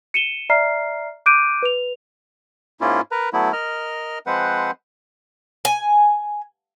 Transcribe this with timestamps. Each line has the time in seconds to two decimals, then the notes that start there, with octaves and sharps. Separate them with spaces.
0.14 C#7 D#7 E7 G7
0.50 D5 E5 A#5 F6 C7
1.26 D6 F#6 G6 D7 D#7
1.62 B4 F7
2.81 G#2 A#3 C#4 E4 F4
3.11 A#4 B4 A#5
3.33 F#3 A3 B3 E4
3.53 A#4 D#5 F6
4.26 F3 G#3 C4 B4 C5 F#5
5.65 G#5